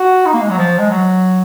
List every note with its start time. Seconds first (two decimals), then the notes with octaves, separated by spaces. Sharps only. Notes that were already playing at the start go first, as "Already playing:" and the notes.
Already playing: F#4
0.25 D#4
0.33 A#3
0.42 G#3
0.50 F#3
0.58 F3
0.79 G#3
0.90 F#3